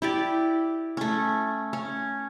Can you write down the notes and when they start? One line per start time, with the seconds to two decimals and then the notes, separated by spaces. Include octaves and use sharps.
0.02 E4 G4 D5
0.97 A3 C#4
1.73 C#4